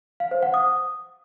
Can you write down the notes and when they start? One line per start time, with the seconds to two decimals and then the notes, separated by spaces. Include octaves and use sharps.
0.20 F5
0.31 C5
0.43 F#5
0.54 D#6